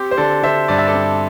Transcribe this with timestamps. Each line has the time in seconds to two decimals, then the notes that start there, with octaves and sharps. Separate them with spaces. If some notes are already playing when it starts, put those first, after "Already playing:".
Already playing: C4 G4
0.11 C5
0.17 D3 A4 D5
0.43 D3 C5 E5
0.68 G2 D5
0.78 E5
0.87 A4 D5
0.94 C4